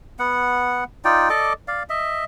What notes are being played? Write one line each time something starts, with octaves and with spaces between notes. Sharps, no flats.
B3 F#5
D#4 F4 D5 G5
A4 D5 D#5 D6
D5 F5
D#5 E5